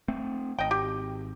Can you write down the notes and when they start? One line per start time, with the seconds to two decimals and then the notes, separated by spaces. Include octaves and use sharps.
0.08 A3 C4
0.59 G#1 D#5 G5
0.71 G4